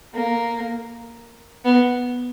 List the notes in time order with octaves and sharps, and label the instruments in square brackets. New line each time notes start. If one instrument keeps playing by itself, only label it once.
[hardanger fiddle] A#3
B3